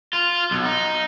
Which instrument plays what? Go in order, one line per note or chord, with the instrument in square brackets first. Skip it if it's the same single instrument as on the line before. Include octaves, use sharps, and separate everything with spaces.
[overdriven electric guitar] F4
B1
D#4